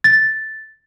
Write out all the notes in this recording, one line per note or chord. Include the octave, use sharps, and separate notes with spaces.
A6